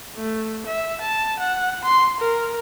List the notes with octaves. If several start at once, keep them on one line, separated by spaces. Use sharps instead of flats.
A3
E5
A5
F#5
C6
A#4